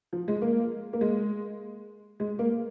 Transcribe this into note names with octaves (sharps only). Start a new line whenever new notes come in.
F3
G#3
A#3
A#3
G#3
G#3
A#3